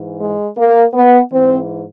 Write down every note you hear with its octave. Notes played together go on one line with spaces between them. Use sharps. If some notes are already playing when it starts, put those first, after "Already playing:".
Already playing: G#2 E3
G#3
A#3
B3
G#2 E3 C4